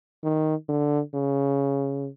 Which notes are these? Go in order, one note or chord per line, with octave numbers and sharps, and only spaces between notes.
D#3
D3
C#3